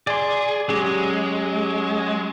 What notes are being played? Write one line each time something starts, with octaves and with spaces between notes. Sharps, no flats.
G#4 D5 C6
F#3 G#3 C#4 G4